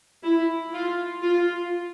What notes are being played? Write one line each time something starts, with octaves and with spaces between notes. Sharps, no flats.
E4
F4
F4